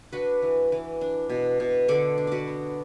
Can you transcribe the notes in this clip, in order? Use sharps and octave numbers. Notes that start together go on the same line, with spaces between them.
D4 F#4 B4
E3
E3
D4
B2
B2
D3 A4 D5
D4
F#4 B4 D5
B3